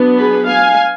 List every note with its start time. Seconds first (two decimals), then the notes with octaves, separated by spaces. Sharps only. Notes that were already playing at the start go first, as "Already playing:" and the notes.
Already playing: F#3 B3 D4
0.19 G#4 B4
0.47 F5 G#5